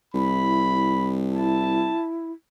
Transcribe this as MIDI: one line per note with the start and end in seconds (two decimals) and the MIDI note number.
0.14 1.91 36
0.14 0.98 64
0.14 1.13 83
1.30 2.32 64
1.30 2.06 81